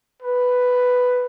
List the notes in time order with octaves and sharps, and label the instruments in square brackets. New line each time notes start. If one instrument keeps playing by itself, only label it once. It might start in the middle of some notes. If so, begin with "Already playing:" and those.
[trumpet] B4